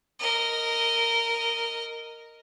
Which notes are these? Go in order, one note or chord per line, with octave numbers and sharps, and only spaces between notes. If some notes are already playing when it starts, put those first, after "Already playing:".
A#4 D#5